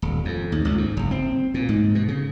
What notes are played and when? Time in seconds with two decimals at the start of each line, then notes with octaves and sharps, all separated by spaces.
0.02 D#1
0.25 F2
0.52 D#2
0.65 C#2
0.78 G#2
0.97 F#1
1.11 C4
1.54 A#2
1.69 G#2
1.95 B2
2.08 C#3